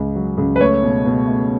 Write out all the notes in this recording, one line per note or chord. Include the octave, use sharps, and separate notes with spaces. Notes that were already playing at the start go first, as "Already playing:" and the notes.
Already playing: C#2 C#3 G#3
F#3
C#2
B4
A3 C#5
B2
B2
A3